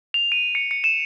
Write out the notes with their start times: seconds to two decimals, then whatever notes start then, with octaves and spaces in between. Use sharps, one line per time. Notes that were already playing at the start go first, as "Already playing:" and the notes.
0.14 F7
0.32 D#7
0.55 C#7
0.71 C#7
0.84 E7